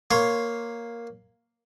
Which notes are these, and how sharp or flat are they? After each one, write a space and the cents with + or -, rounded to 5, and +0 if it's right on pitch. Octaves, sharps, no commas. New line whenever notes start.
A#3 +0 C#5 +0 C6 +0